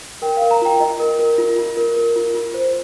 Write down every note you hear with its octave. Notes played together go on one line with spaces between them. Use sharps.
A#4 G5
F5
A#4
A#5
F4 G5
F4 D#5
A#4
A#4
F4
F4
A#4
A#4
F4
F4
C5